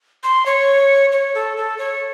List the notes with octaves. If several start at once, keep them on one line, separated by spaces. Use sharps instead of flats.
C6
C#5
C#5
A4
A4
C#5